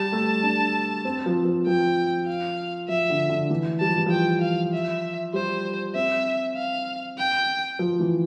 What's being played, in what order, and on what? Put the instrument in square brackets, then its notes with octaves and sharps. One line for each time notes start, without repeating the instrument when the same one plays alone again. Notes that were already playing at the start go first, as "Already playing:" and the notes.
Already playing: [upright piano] G3 [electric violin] A5
[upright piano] A3
D4
C4
F3
F3
[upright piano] F3 [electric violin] G5
[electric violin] F5
[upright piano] F3 [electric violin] E5
[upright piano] D3
D3
E3
[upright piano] G3 [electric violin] A5
[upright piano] F3
E3
[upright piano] F3 [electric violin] G5
[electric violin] F5
E5
[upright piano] G3 [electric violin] C5
[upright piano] C4 [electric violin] E5
[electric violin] F5
G5
[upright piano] F3
E3